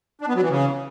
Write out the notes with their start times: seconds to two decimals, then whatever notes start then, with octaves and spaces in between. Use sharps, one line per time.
0.21 D4
0.28 B3
0.35 F#3
0.42 E3
0.50 C#3